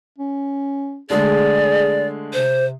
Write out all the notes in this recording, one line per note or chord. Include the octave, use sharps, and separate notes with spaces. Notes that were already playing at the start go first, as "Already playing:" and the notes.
C#4
D3 G#3 A3 G#4 D5
C3 C5